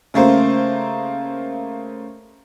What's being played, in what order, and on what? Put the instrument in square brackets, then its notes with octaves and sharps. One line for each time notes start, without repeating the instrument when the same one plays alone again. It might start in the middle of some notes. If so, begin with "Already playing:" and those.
[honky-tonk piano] C#3 A3 A#3 C5